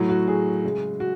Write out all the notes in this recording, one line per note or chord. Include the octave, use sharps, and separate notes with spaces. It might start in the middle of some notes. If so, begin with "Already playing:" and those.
Already playing: A2 F#3
F#4
G#4
C#3 G#3
F#4